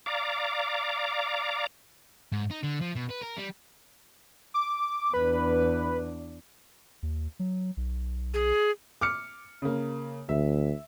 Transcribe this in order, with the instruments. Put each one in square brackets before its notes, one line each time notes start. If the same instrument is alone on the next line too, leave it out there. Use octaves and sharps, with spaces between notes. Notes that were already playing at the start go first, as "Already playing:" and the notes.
[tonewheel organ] D5 F5 A#5 D6
[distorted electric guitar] G#2
D#4
D3
F3
B2
B4
A#4
G3
[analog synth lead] D6
[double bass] E2 D4 [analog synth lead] B4
[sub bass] D#2
F#3
B1
[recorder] G#4
[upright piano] D6 F6 C#7
C#3 A#3
[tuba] D2 [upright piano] E5